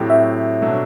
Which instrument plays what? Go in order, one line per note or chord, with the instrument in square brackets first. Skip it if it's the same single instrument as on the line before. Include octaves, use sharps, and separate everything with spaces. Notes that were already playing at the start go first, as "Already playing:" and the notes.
Already playing: [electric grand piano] A2 F#3 C4 G4
[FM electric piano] E5
[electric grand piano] B2 F#3 A3 D4